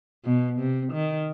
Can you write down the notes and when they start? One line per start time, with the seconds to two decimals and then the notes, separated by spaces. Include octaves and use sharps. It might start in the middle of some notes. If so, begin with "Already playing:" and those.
0.25 B2
0.59 C3
0.93 D#3